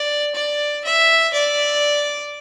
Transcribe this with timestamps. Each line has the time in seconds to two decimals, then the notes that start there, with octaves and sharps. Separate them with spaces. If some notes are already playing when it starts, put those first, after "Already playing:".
Already playing: D5
0.35 D5
0.84 E5
1.33 D5